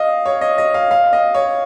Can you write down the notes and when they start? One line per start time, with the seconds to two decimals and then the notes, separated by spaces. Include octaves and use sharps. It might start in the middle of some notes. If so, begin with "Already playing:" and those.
Already playing: D#5 F5
0.26 C#5
0.41 D#5
0.58 D#5
0.74 F5
0.91 F5
1.13 D#5
1.35 C#5